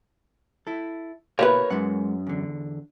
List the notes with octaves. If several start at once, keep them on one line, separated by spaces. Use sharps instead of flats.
E4 A4
B2 A#3 E4 G4 A#4 B4 C#5
F#2 G#3 F#5
E2 D3